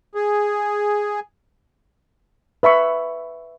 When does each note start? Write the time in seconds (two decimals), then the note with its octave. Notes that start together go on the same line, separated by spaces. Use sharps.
0.15 G#4
2.63 B4 E5 B5 C#6